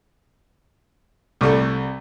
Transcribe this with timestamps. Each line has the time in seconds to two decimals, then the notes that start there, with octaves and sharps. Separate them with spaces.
1.41 C2 A3